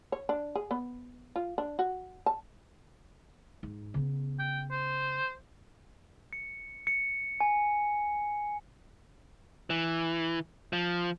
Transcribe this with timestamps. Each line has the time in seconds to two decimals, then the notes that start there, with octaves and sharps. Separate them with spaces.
0.12 C#5
0.29 D4
0.55 G#4
0.71 B3
1.36 F4
1.58 D4
1.79 F#4
2.26 A5
3.63 G#2
3.94 C#3 B3
4.39 G5
4.72 C5
6.33 C#7
6.87 C#7
7.40 G#5
9.70 E3
10.73 F3